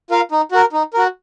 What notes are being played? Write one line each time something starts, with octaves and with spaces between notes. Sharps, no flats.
F4 A#4 F5
D#4
F#4 A#4
D#4
F#4 A#4